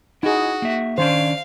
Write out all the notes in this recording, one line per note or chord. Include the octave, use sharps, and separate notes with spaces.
D#4 E4 F#4 G#4
A#3 E5
D#3 C#4 D4 C5 F5